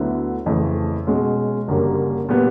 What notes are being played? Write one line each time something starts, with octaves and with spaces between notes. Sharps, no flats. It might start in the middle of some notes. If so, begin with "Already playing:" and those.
Already playing: D2 D3 F#3 B3 E4
F2 C#3 E3 A3
B2 G#3 C#4
F#1 F#2 D3 G3 A#3
A#2 G3 B3